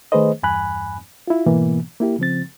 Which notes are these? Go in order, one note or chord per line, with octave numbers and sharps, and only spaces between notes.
D#3 A3 G#4 B4 C5 D#5
E2 G2 G#5 B5 F#6
E4 F4
G#2 B2 E3 A#3 B3
A#3 E4 G4
C#3 F3 C4 A6